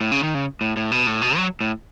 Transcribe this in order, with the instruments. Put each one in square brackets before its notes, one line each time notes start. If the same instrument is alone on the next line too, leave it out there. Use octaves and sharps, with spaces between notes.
[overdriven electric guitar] A2
C#3
D#3
C#3
A2
A2
B2
A2
B2
F#3
A2